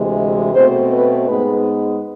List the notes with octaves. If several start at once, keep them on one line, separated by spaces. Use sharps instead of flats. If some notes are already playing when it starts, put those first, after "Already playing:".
Already playing: D2 C3 E3 G#3
B2 A3 C4 C5
B4
G#2 G#3 B3 B4